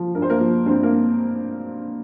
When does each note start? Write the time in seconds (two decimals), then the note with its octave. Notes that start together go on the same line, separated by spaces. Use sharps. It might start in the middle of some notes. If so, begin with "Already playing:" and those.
Already playing: F3
0.15 G2 A#4
0.22 C5
0.30 A#3 A#4
0.40 F3
0.66 G2 C4 C5
0.83 A#3 A#4